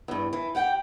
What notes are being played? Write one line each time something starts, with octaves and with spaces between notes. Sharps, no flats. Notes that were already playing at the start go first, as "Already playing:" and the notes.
E2 G2
E3
G4 F#5 G5